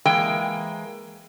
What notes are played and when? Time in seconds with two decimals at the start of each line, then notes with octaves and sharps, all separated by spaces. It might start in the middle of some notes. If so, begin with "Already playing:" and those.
0.05 E3 G#3 A#3 G5